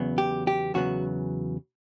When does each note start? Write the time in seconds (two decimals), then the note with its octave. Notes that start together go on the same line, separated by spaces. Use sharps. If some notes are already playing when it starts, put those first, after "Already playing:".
Already playing: E2 C#3 F#3 B3
0.18 G4
0.47 G4
0.74 E2 C#3 F#3 B3 F#4